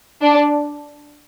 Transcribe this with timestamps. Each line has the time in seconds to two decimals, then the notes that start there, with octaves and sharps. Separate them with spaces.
0.22 D4